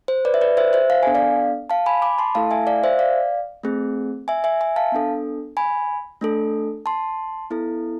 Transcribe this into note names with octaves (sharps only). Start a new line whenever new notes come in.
C5
B4 D5
E5
B4 D5
C5 E5
C5 E5
F5
B3 D4 A4 G#5
D5 F5
F5 A5
G#5 B5
B5 D6
A5 C6
A3 E4 A4 F5 A5
E5 G#5
D5 F5
C5 E5
D5 F5
A3 C4 G#4
E5 G#5
E5 G#5
E5 G#5
F5 A5
B3 D4 A4
G#5 B5
A3 D4 A4
A5 C6
B3 E4 A4